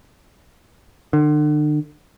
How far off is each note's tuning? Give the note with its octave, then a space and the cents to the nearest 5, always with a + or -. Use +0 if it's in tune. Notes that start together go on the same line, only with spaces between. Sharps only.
D3 +40